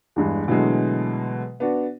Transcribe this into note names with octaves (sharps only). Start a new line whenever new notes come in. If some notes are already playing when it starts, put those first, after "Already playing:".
E2 G2 G#3
B2 D3 E3 F#3 G#3 A3
B3 D4 F#4